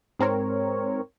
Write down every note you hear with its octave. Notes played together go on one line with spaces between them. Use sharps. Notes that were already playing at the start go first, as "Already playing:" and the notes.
G#2 C4 A#4 C#5